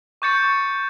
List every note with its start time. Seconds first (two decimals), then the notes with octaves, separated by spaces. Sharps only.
0.22 C#6 D6 G6 A6 C#7